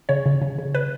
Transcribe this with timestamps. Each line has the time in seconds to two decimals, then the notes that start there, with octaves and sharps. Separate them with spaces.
0.09 C#3 C#5
0.26 C#3
0.42 C#3
0.58 C#3
0.75 B4